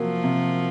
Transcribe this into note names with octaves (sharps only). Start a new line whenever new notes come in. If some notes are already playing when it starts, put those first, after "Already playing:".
Already playing: C3 F3 F#3 A#3
C3